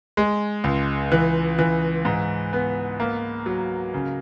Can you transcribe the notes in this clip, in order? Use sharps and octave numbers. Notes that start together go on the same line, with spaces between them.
G#3
C#2
E3
E3
G#2
B3
A#3
F#3
C#3